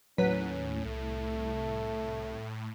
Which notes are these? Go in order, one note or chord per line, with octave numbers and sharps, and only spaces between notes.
D#2 A2 F#3 C#4 B4
C2 A3